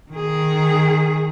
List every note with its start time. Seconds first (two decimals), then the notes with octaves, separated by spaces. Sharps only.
0.12 D#3 G#4